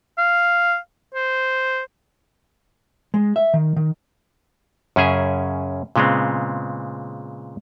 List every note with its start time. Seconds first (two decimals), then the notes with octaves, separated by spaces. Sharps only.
0.18 F5
1.14 C5
3.14 G#3
3.36 E5
3.54 D#3
3.76 D#3
4.96 F#2 C#3 C#4 G#4 E5
5.96 A#2 C#3 G#3 B3 C4